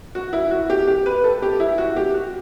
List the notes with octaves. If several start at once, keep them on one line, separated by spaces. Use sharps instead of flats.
F#4
E4
F#4
G4
G4
B4
A4
G4
E4
F#4
G4
F#4